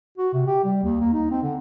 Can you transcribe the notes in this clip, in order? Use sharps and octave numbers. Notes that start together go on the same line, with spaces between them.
F#4
C3
G4
G3
D#2
A#3
D#4
C4
D3